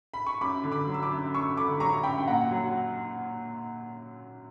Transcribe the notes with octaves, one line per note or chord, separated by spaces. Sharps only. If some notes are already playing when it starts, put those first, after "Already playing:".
B5
C#6
F#2 B5 D6
D3
B5 D6
F#3
E6
B5 D6
F#2
F#2 C#6 E6
D3 B5 D6
F#3 A#5 C#6
F#2 G5 B5
G5
A#2 F#5 A#5
F#3